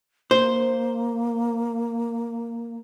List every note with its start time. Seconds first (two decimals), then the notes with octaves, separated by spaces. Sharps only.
0.31 A#3 C5